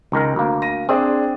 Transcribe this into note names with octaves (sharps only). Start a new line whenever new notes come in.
C#2 D#3 A#4
D2 A#3
A#6 D#7
C4 D4 G#4 D#6